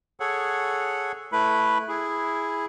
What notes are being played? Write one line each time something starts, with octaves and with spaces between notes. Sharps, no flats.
G#4 A4 C#5 F#5
A3 E4 B4 B5
E4 G#4